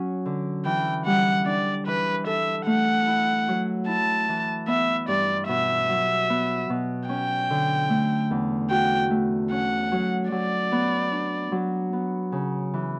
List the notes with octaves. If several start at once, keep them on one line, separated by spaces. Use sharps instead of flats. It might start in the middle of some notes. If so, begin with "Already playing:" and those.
Already playing: F#3 C#4
D3
E3 G5
G3 F#5
D4 D5
E3 B4
A4 E5
A3 F#5
E4
F#3
E4 A5
E3
B3 E5
G2 D5
B2 E5
F#3
B3
B2
C#4 G5
D3
A3
E2
F#4 G5
A3
C#4 F#5
F#3
F#3 D5
B3
D4
F#3
B3
C#3
E3